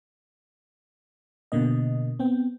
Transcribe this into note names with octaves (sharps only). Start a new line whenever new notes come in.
B2 D3 A#3 D#5
B3 C4 G5